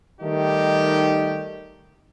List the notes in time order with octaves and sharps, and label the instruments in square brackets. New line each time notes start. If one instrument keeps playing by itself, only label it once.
[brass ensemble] D#3 G3 A3 D#4 G4